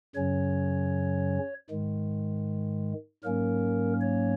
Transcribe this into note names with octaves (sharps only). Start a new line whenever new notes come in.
F#2 C#3 F#3 C#4 C#5
G#2 D#3 G#3
G#2 F#3 A#3 C#4 A#4
C#5